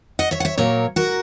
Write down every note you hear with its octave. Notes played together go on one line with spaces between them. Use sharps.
D#5 F#5
C#5 E5
F#5
C#5 E5
A#2 F#3 A#3 A#4 C#5
F#4 A#4